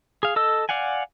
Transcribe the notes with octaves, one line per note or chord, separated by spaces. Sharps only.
G#4 F5
A4 D#5 E6
D5 F5 F#5 G#5